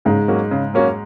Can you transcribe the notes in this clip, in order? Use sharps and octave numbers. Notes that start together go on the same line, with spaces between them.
G#2 C#3 G#3
F#3 A#3 C#4 F#4
C#3
F#3 A#3 C#4 F#4